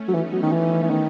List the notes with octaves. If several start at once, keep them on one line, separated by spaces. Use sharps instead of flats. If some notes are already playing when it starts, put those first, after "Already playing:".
Already playing: A3 C#4
F#3
E3 B3 D#4
F#3
D#3
E3
E3
D#3